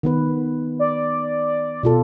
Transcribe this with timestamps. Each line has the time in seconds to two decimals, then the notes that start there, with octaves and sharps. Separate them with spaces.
0.03 D#3 B3 B4
0.79 D5
1.83 B2 F4 A4